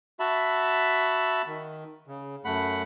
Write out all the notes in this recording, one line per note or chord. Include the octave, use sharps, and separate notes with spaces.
F#4 E5 A5 B5
D#3
C#3
F#2 A3 F#5 B5